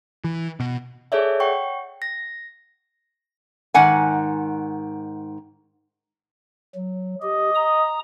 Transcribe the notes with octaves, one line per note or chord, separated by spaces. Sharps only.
E3
B2
G#4 A4 C#5 D5 E5
F#5 G5 C#6
A#6
G#2 D#3 F#5 G#5
F#3
G4 D#5
A#5 D#6